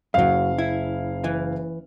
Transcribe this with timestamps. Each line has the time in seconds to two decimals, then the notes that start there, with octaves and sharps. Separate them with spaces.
0.14 F#1 F#2 F#3 F5
0.58 E4
1.24 E3